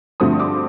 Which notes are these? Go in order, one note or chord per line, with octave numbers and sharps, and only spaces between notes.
G2 D3 F3 A3 C4 D#6
D6